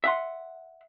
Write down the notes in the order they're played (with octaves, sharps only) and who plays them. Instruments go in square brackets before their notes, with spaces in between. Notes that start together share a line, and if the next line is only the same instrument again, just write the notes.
[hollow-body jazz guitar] E5 F#5 C6